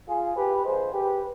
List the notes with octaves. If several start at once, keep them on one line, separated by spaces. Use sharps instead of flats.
F4 G#4
G4 B4
D3 F3 G#3 G#4 C5
G4 B4